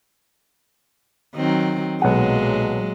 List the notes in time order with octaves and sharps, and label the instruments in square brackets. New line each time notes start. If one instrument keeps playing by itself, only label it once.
[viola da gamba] D#3 F#3 C4
[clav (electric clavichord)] B1 F#5 [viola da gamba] A#2 F#3 G#3